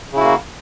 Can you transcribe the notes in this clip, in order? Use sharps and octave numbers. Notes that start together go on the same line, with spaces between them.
C#3 A#3 E4 F#4